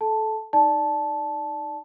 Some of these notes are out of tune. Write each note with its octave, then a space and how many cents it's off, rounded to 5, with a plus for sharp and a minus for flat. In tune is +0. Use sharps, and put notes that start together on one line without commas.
A4 -20 A5 +0
D#4 +0 D5 +0 A5 -10